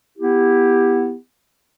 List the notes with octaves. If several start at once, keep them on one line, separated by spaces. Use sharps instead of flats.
B3 E4 G4